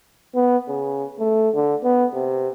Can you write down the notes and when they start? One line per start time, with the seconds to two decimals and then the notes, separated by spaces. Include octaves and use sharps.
0.35 B3
0.68 C#3
1.19 A3
1.54 D3
1.83 B3
2.13 C3